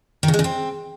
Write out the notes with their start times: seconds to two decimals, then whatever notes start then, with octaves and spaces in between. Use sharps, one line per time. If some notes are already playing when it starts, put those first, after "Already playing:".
0.23 D#3
0.28 C#3
0.34 G#3
0.39 C#3
0.44 C4